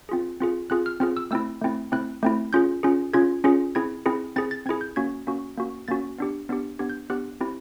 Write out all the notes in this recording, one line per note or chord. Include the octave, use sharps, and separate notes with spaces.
C4 F4 G#4
C4 F4 G#4
C4 F4 G#4 F#6
F6
C4 F4 G#4 F6
E6
A3 C4 E4 E6
A3 C4 E4
A3 C4 E4 F#6
A3 C4 E4
C#4 F4 G#4 G6
C#4 F4 G#4
C#4 F4 G#4 G#6
C#4 F4 G#4
C4 E4 G#4 G#6
C4 E4 G#4
C4 E4 G#4 A6
A6
C4 E4 G#4 G#6
G6
A#3 C#4 F#4 G#6
A#3 C#4 F#4
A#3 C#4 F#4
A#3 C#4 F#4 A6
B3 D4 G4
B3 D4 G4
B3 D4 G4 G#6
G6
B3 D4 G4 F#6
C4 E4 G4